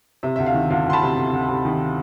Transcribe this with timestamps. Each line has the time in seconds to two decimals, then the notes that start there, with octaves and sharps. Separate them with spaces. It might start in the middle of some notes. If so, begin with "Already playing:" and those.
0.23 C3 E5
0.36 D2 E5
0.46 F5
0.54 D#3
0.70 D2 F5
0.86 D2 C6
0.93 A5 B5
1.02 C3
1.17 D2
1.33 D2
1.48 C3
1.65 D#3